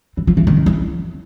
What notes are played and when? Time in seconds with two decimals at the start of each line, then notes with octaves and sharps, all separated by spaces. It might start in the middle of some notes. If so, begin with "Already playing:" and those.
0.17 E3
0.27 F3
0.37 E3
0.47 D#3
0.66 E3